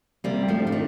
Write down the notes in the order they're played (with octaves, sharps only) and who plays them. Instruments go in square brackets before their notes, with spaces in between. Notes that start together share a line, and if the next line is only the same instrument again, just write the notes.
[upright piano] C3 [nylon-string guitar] G3 A#3
[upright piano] G4
[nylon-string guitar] F3 A3
[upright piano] D4
[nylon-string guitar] F3
D#3